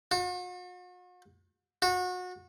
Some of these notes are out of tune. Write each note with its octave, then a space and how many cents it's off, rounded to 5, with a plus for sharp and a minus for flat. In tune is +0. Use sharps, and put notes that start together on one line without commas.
F#4 -45
F#4 -30